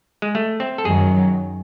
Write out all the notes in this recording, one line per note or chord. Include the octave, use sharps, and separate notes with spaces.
G#3
A3
C4
A4
F#2 D#3 F#3 G#4